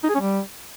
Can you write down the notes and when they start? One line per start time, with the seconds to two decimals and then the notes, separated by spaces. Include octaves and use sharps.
0.04 D#4
0.09 G#4
0.15 C#4
0.20 G3